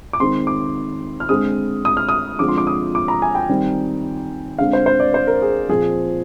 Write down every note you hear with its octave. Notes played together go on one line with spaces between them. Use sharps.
D6
D#3 G#3 C4 C6
D6
F6
D3 G#3 C4 D#6
D#6
F6
D#6
D3 F3 G#3 C4 D6
C6
D6
D#6
D6
A#5
G#5
G5
D#3 G3 C4
D3 G#3 C4 F5
C5
C5
D5
C5
A#4
G#4
A#2 F3 C4 G#4